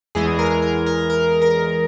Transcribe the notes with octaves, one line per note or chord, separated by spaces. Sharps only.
E2 E3 G#3 G#4
A#4
A#4
A#4
A#4
A#4